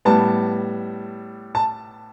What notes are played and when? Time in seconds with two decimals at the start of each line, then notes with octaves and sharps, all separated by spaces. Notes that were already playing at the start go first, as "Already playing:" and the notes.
0.05 A2 G3 B3 A5
1.55 A5